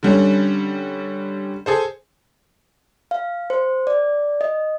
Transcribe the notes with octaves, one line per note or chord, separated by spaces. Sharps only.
D3 G3 C#4
G#4 A4 C5
F5
C5
D5
D#5